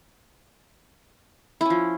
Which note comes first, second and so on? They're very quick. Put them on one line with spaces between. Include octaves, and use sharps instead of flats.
E4 C#4 F3